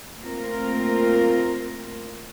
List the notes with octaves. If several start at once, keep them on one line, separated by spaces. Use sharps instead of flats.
A3 A#3 C4 F4 A#4